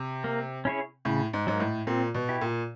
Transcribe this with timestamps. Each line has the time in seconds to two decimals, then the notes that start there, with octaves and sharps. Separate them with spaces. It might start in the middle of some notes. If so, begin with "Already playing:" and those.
Already playing: C3
0.24 A#3
0.65 C#4 E4 G#4 C#5
1.05 A2 C#3
1.33 G#2
1.47 G#2 F#3 A#3
1.60 A2
1.87 A#2 C4
2.15 B2
2.29 E4 G4
2.41 A#2